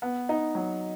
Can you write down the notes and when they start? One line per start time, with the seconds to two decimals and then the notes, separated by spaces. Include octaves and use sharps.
0.02 B3
0.29 D#4
0.55 F#3